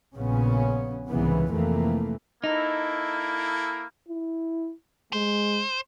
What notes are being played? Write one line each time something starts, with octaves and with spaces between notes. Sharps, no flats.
A#1 A#2 C#3 B3 C#4
C2 G#2 C#3 E3 B3
F2 C3 E3 A3 A#3
A#3 D#4 E4 A4
E4
G#3 C5